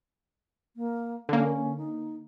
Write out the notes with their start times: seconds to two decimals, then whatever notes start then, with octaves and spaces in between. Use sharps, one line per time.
0.76 A#3
1.29 D3 A#3 C#4
1.77 D#4